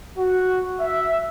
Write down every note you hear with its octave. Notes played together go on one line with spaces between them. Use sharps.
F#4
E5